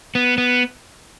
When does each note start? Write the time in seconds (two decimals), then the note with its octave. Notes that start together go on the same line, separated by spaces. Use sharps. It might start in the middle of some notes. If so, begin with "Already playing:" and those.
0.15 B3
0.38 B3